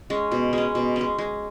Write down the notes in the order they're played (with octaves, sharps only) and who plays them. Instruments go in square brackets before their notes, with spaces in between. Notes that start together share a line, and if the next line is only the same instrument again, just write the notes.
[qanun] G#3 C#4
B2
G#3 C#4
B2
G#3 C#4
G#3